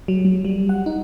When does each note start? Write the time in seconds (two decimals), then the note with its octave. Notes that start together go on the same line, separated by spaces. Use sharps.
0.08 F#3
0.25 F#3
0.45 G3
0.69 F#5
0.86 D#4